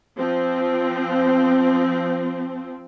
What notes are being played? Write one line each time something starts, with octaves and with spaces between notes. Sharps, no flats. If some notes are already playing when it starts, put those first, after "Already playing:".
F3 C4